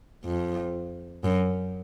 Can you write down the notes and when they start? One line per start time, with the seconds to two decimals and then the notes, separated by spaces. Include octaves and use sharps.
0.25 F2
1.24 F#2